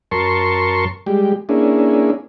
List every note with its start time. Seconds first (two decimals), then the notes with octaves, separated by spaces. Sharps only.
0.11 F#2 A#4 A5 C6 C#6
1.07 G3 G#3 G4
1.49 A#3 C#4 D4 E4 G#4